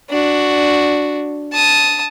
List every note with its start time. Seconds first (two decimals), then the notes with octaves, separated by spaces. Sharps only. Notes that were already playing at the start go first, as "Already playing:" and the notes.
0.10 D4 F#4
1.53 A5 D#6